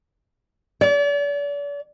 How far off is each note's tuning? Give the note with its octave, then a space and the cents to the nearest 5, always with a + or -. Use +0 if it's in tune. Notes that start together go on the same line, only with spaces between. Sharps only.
D5 -40